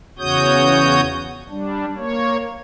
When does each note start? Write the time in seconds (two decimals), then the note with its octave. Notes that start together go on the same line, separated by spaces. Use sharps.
0.19 E2 C#3 F#4 C#5 D#6 G6
1.50 G3 D4
1.97 A#3 C#5